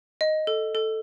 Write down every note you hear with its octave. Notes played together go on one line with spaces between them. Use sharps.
D#5
A4
A4